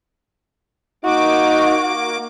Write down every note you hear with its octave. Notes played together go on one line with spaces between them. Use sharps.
A#3 D#4 F#4 D6